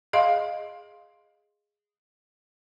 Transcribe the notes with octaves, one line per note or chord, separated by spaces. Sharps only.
G#4 D#5 F5 C6